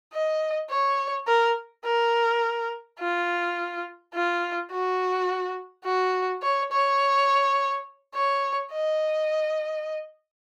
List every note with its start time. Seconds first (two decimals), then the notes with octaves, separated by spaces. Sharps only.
0.13 D#5
0.70 C#5
1.27 A#4
1.85 A#4
3.00 F4
4.14 F4
4.71 F#4
5.85 F#4
6.42 C#5
6.71 C#5
8.14 C#5
8.72 D#5